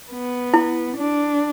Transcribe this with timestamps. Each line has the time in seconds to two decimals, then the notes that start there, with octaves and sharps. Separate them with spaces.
0.12 B3
0.54 E4
0.97 D4